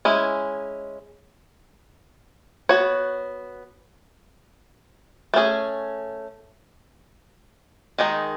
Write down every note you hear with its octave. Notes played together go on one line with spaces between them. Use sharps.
G#3 C#4 E4
B3 F#4 C#5
A3 C#4 G#4
D#3 G#3 D#4